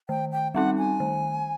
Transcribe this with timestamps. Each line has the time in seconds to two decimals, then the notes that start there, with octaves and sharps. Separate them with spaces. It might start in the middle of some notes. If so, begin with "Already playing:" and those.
0.09 D#3 G5
0.32 G5
0.55 G3 C4 D#4 F#5
0.78 G#5
1.00 D#3